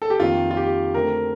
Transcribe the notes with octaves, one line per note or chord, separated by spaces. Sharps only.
A4
G4
F2 D#3 A#3 F4
F4
G4
D3 A3 C4 A#4